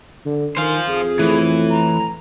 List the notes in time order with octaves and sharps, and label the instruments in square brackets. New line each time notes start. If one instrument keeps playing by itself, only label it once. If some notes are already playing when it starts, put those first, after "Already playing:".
[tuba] D3
[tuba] D#3 [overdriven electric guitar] C5 F5 [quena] G#5
[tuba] F2 [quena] G#4
[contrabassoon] A2 [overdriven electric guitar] E3
[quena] A#5